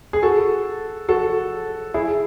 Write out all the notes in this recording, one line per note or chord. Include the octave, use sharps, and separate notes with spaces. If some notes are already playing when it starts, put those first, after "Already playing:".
G#4
F#4 A4
F#4 A4
E4 G#4